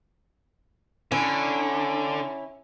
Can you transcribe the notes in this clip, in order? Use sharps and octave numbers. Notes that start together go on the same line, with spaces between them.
D3 C#4 E4